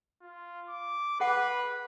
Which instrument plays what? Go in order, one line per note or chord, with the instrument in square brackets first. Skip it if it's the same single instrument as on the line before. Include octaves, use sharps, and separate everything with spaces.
[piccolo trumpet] F4
D6
[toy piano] G#4 F#5 D6 [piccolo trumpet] B4